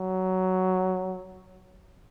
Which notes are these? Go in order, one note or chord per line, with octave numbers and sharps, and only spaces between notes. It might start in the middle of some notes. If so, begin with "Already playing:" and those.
Already playing: F#3